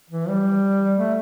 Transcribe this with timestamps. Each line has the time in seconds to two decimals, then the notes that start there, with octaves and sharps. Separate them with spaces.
0.10 E3
0.28 G3
0.98 A3